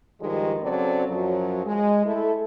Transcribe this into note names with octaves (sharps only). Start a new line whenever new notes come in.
G2 D#3 F3 G3 G#3
C#3 F#3 C4 A4 D5
F#2 F3 F#3
G#3
A3 E4 A4